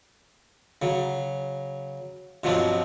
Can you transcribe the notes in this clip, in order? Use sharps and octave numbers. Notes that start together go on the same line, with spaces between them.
C#3 F#3
G2 B2 F3 F#3 C4 D4